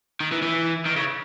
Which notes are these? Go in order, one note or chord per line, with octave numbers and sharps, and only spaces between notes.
D#3
E3
E3
D#3
C#3